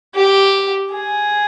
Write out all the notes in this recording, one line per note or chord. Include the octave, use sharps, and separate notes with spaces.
G4
G#4